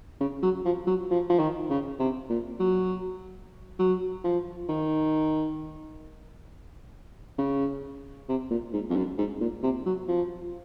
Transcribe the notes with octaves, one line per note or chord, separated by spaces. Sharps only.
C#3
F#3
F3
F#3
F3
F3
D#3
C#3
C3
A#2
F#3
F#3
F3
D#3
C#3
C3
A#2
G#2
F2
F#2
G#2
A#2
C3
F#3
F3